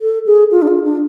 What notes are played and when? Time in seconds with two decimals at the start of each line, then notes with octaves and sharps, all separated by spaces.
0.01 A4
0.26 G#4
0.51 F4
0.62 D4
0.68 F4
0.84 D4